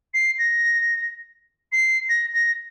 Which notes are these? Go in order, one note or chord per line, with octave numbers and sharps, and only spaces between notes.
C7
A#6
C7
A#6
A#6